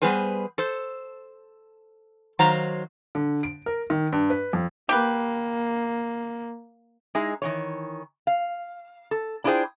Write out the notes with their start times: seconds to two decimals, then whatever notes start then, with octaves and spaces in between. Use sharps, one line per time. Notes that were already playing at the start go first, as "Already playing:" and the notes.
0.02 G3 B3 G#4 B4 C5
0.58 A4 C5
2.39 D#3 F#3 C5 F5 A#5
3.15 D3
3.43 D7
3.66 A#4
3.90 D#3
4.12 G2
4.30 B4
4.53 F2
4.89 A#3 G4 B4
7.15 G#3 D#4 E4 G#4
7.42 D#3 E3 C#5
8.27 F5
9.11 A4
9.44 D4 E4 F4 G#4 C5 G5